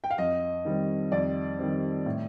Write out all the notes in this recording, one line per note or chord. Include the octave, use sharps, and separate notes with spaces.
G5
F5
F2 D#5
D#3 G3 C4
F2 D5
D#3 G3 C4
A2